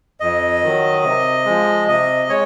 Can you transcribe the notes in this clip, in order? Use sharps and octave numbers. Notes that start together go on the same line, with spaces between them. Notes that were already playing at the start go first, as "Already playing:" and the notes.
F2 D#5
D#3 F#3
C3
F3 G#3
C3 D#5
G#3 C#5